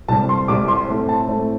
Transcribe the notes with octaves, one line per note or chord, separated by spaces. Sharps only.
C2 C3 G3 C4 A5
C6
C2 C3 G3 C4 D6
C6
A2 A3 C4
A5
A2 A3 C4